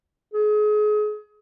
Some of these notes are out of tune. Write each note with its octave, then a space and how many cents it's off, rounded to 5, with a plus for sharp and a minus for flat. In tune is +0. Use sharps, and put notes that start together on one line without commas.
G#4 +30